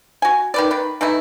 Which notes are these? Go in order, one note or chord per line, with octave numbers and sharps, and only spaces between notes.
F#4 G#5
D#3 B4 D5
D#3 B4
E3 A3 D#4 E4